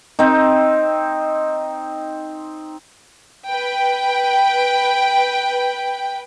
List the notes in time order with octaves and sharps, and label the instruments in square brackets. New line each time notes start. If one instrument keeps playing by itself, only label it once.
[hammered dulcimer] C4 D#4
[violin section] B4 G5